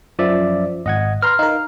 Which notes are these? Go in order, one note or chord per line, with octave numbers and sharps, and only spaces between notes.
F#2 F3 D5 E5
G#1 D#5 F#5 G#6
B4 A#5 C6 F6
D#4 A#4 F5